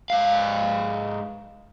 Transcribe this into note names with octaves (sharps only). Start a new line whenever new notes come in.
G#2 F5